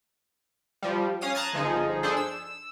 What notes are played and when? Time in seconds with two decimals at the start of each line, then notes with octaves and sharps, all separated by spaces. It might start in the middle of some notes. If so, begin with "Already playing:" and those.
0.82 F3 G3
1.21 C#4 F5 D#6 D#7
1.35 A5 A#5 D#6 F#6 G#6 A6
1.53 G1 F3 D#4 G#4
2.03 D4 G#4 A4 C5
2.17 E6